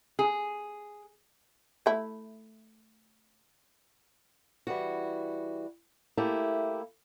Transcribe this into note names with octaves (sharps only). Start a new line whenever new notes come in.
G#4
A3 E4
E3 G3 F#4
A3 A#3 E4 G4